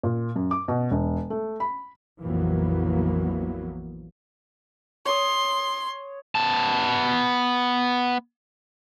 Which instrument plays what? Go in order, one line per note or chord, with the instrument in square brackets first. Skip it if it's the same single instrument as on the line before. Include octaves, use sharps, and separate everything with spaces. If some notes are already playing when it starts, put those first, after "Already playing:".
[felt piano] A#2
F#2
D6
B2
E1
A3
B5
[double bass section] A#1 F2 E3 F#3 A#3 B3
[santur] C#5 D#6 [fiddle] C6
[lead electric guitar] B3 A5